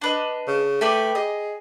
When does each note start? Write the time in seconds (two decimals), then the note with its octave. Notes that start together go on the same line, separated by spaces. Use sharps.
0.01 D4 B4 D#5
0.48 C#3
0.81 A3 G4 B4 D5
1.15 G#4 D#5